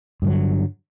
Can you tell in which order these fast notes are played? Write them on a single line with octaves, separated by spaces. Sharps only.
G2 D3 F#3